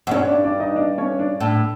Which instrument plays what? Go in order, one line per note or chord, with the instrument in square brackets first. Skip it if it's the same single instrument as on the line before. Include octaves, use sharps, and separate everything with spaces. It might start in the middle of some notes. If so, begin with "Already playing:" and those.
[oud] F#2
[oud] G2 [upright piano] C#4 C#5
[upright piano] D4 D5
D4 D5
D#4 D#5
D4 D5
C#4 C#5
D4 D5
[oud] A2